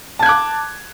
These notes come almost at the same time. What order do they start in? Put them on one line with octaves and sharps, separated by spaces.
A5 G#6 F#6 D6